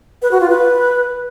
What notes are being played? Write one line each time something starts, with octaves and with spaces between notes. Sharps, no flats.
B4
F#4
F4
B4